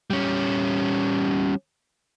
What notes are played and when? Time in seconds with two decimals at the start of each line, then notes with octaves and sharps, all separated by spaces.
0.10 G3 C#4